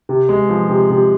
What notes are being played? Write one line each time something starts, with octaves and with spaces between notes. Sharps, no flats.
C3
G#3
F3
C3
C3